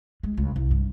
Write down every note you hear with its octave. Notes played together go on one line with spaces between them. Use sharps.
G#3
C#2
C2
G2